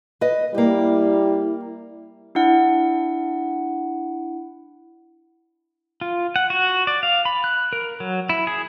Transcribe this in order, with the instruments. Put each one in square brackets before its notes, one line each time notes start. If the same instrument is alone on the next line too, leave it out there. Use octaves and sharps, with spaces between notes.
[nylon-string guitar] B4 D#5
[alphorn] G3 [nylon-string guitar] A#3 G4 [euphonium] E4
[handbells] D4 E4 F#5
[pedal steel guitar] F4
F#5
F#4
D5
F5
B5
F#6
A#4
F#3
E4
G#4